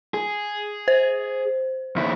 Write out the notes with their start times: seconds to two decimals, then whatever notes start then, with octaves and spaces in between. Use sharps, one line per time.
0.14 G#4
0.88 C5
1.96 D#2 E4